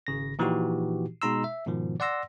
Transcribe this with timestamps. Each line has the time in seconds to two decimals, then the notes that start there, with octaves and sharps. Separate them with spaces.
0.07 G#1 C#3 A#6
0.39 A#2 E3 F3 D#4 F#4 G4
1.22 B2 G#3 D#4 A#5 C6 E6
1.44 E5
1.66 G#2 B2 D#3 F3
2.00 D5 F#5 C6 E6 A#6